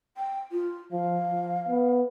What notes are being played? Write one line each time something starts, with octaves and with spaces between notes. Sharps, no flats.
G5
F4
F3 F5
F3
B3